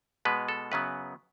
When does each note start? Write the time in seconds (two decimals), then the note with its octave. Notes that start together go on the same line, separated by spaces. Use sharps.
0.25 B2 G#3 B3 B4
0.48 A4
0.72 F#2 C#3 F#3 B3 B4